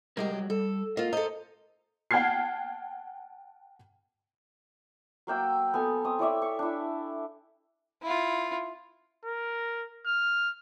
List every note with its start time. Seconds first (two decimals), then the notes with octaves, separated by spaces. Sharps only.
0.17 C3 G3 G#3 G4 A#4
0.31 F#3 G3
0.50 G3 A4
0.97 A#3 F4 D#5
1.13 A4 C5 D#5 A#5
2.11 F#5 G5 A5 F6 G#6 C7
5.27 F#3 A#3 G5 E6
5.74 B3 A4 G#5
6.04 C4 D#6
6.19 E4 C#5 D5 E5
6.42 C#6
6.59 D4 E4
8.03 E4 F4
9.25 A#4
10.06 F6